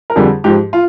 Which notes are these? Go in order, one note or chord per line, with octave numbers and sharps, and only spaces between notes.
A#4
F2 D3 G3 G#4
G#2 F3 G4
F4